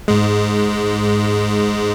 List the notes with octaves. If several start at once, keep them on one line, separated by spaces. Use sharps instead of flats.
G#2 G#3